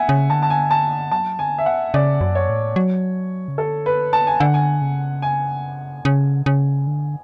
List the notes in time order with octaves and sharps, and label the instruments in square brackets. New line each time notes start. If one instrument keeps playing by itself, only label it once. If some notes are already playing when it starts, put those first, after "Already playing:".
Already playing: [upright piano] E5 F#5 G#5
[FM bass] C#3
[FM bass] D3 [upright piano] A5
[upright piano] A5
G#5
A5
[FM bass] F#3 [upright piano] A5
[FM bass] D3 [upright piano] G#5
[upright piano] E5
F#5
[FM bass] C#3 [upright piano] D5
[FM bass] F#2
[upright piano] C#5
[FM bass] A2
F#3
C#3
[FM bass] D3 [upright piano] A4
[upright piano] B4
A5
G#5
[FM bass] D3 [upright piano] F#5
[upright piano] G#5
[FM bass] C#3
[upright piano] G#5
[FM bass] C#3
C#3
D3